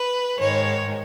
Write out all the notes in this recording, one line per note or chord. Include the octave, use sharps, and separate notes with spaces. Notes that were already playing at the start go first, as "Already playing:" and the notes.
Already playing: B4
G#2 D#3 G#3 C#5